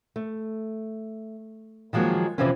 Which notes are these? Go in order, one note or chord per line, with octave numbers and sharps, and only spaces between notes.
A3
D#3 F3 F#3 G#3 A#3
F2 C3 E3 F3 C4 C#4